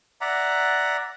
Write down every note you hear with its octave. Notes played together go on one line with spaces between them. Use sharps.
D5 E5 F#5 A#5